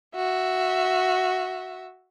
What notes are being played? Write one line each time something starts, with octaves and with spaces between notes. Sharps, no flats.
F#4 E5